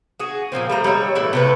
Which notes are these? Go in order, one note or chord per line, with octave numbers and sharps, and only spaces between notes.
F#4 G#4
A#2 F3 A#3 C4
G3 A3 A#5
G3 G#3 C#5 E5
A2 E3 E4 E5
C3 A3 B4